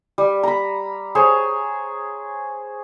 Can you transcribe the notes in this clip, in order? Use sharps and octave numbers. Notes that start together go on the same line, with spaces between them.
G3
A#5 B5
G#4 C5 C#5